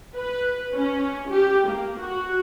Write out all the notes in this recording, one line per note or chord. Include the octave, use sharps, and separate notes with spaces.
B4
C#4
G4
A#3
F#4